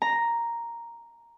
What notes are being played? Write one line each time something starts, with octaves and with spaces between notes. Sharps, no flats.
A#5